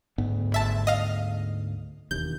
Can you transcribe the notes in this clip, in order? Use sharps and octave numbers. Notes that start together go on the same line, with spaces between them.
D2 G#2 B3
G#1 E5 A5
D#5 F5
E1 D#2 G6